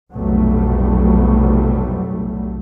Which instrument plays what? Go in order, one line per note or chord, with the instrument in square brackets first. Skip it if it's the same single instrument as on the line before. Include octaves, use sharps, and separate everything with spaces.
[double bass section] F1 B1 A2 F#3 G3 A3